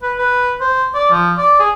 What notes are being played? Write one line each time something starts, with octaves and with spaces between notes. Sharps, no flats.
B4
B4
C5
D5
F3
D5
G#4